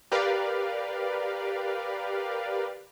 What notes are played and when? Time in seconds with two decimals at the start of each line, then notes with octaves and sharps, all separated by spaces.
0.12 G4 A#4 B4 D5 F5